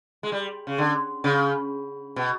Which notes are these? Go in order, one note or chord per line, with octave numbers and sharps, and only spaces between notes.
G#3
G3
C#3
D3
C#3
B2